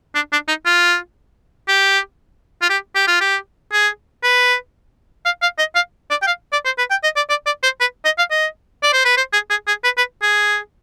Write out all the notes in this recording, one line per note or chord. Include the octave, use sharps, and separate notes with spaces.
D4
D4
D#4
F4
G4
F4
G4
G4
F4
G4
G#4
B4
F5
F5
D#5
F5
D5
G5
F5
D5
C5
B4
G5
D#5
D5
D5
D5
C5
B4
D#5
F5
D#5
D5
C5
B4
C5
G#4
G#4
G#4
B4
B4
G#4